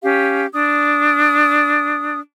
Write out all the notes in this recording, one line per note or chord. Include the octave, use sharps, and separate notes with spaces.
C#4 G4 F5
D4 D#6